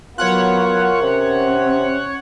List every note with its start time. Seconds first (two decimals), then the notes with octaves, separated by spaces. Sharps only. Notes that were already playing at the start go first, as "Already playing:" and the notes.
0.18 F#3 B3 F4 A#4 C#5 F#5 F#6
1.02 C3 C#4